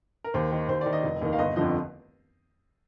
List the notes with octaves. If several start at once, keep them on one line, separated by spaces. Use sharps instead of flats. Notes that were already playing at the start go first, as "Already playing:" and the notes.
A#4
D#2 C5
D#3
D#2 C5
D#3 D5
D#5
F1
D#2 D#3
F5
G1 D#5
F2 D3 F3 D#5